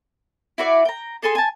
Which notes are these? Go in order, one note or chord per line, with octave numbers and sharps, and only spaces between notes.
E4 F#4 D5
G5 A#5
G#4 A4 G#5 C6
G#5 A5